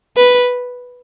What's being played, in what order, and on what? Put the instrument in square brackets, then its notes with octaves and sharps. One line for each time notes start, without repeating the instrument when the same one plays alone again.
[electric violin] B4